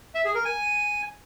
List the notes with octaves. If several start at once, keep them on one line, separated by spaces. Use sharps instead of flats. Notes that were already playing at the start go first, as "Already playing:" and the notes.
E5
G#4
A#4
G#5